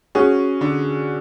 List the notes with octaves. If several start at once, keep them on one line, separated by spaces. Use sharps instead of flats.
C#4 F#4 G#4
D3